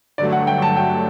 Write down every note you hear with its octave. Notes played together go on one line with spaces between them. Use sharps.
G2 D3 F#3 A3 D5
F#5
G5
A5
G5